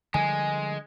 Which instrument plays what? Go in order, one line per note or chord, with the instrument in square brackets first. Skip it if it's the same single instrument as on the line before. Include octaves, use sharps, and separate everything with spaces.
[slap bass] D3 F3 G3 [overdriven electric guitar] G#3 [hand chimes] G#5